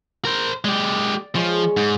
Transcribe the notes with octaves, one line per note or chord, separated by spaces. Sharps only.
A#4 C5
G#3 G4 D5
F3 G#3 C#5
G#2